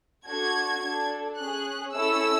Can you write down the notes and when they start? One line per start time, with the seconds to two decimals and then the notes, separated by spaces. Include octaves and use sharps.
0.27 D4 F#4 A4 G#6
0.83 D4 A4
1.39 C#4 G#4 F#6
1.95 C#4 E4 A4 E6